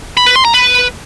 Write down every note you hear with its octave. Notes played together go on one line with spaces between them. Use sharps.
B5
B4
C6
A#5
B4